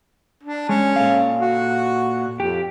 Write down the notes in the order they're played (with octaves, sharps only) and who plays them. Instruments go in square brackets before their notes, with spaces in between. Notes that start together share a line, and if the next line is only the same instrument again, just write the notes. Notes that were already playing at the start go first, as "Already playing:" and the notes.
[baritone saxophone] D4
[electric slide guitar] G#3 [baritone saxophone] C#4
[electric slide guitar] A#2 A4 F5
[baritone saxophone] F#4
[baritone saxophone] F2 [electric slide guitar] G4